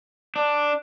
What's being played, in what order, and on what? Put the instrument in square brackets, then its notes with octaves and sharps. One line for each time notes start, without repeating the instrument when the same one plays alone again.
[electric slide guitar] D4